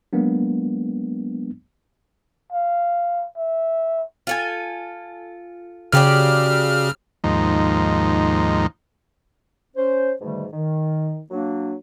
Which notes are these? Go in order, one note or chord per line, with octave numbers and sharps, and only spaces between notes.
F#3 G#3 A#3 B3 D4
F5
E5
F4 A4 G#5
C#3 F#3 G4 D5 F6
D#2 G#2 F3 D#4
C#4 C5
G#2 B2 D3 D#3 G3 A3
D#3
F#3 A#3 D4